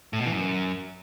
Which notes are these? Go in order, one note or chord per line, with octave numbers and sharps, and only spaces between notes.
A2
B2
E3
F#2